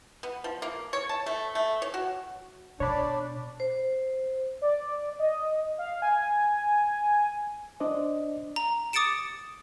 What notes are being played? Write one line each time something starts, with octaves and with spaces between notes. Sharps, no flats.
B3
F3
A#3
C#5
A5
A3
A3
C#5
F#4
B2 D4 C#5 B5
C5
D5
D#5
F5
G#5
D4 C5 D5 D#5
A#5
D6 D#6 A6 C#7 D7 E7